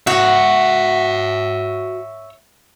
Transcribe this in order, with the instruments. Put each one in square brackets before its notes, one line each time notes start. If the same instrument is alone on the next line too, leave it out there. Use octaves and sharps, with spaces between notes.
[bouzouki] F#4 [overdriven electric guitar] C#5 E5